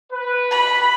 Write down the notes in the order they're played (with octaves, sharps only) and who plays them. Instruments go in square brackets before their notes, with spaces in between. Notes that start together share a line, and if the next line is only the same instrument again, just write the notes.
[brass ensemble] B4
[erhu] B5